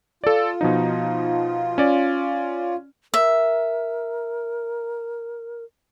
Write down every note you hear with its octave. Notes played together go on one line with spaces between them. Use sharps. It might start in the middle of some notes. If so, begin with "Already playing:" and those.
F4 A4 D5
B2 F3 D#4
C#4 D5
A#4 E5